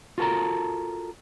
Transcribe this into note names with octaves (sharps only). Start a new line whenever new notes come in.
F4 F#4 A4 A#4 A5 A#5